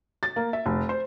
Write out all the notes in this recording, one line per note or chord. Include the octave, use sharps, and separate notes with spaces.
A6
A#3
E5
F1
C5